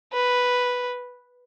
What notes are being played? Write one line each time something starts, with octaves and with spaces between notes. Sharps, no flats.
B4